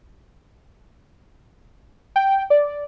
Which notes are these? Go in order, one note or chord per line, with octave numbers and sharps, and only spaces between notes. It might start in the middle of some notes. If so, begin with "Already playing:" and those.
G5
D5